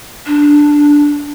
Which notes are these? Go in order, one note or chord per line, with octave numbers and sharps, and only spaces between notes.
D4